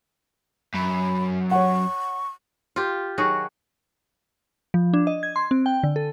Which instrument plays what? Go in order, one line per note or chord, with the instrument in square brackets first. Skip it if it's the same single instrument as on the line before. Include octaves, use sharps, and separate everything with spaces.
[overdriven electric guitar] F#2 [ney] B5
[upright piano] C#5 F#5 [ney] C#6
[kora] F4 G4
D#3 F#3 F#4 G#4
[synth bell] F3
D4
D#5
G#6
C6
C4
G5
D3
A4